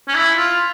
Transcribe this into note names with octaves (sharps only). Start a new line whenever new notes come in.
C#4
E4
F4